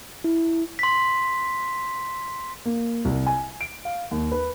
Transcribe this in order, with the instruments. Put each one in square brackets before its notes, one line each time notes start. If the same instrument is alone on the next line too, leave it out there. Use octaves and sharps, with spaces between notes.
[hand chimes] E4
[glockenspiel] C6 B6
[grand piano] A#3
C2
G#5
D7
F5
D#2
B4